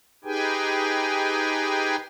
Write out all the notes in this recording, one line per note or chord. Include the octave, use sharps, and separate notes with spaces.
D#4 G4 G#4 B4 G5 G#5